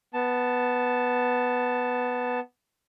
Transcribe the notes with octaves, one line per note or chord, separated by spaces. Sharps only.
B3 A5